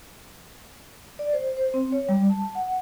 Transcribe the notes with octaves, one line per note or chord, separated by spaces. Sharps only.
D5
C5
C5
C4
C#5
G3
A5
F#5